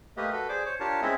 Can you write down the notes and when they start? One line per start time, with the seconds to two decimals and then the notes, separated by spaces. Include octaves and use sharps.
0.17 A3 A#3 G4 B4 D#5
0.33 F#4 A4 B4
0.49 G#4 C5 D5 D6
0.66 C5 C#5
0.80 D4 F4 G4 A#4 C#5 A5
1.02 G#3 C4 C#4 E4 D#5 E5